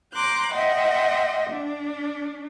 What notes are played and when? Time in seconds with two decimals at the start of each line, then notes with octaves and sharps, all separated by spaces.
0.12 A#5 C6 D6 F#6 G6
0.52 D#5 E5 F#5 G5 C6
1.51 D4